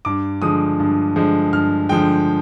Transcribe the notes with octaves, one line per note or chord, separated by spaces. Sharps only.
G2 D6
D3 F3 G#3 D#6
G2
D3 F3 G#3
G2 F6
D3 F3 G#3 G5